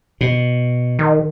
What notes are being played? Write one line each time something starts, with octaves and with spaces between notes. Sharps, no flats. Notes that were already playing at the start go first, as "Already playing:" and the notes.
B2
D#3